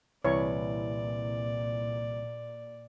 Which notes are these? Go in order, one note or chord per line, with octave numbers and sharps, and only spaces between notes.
C2 A#2 E3 C#5 D5 C#6